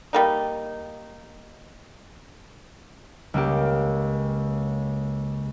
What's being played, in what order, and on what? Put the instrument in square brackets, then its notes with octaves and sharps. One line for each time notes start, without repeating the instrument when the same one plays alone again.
[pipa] G3 A#3 D#4
[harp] C#2 A#3 G4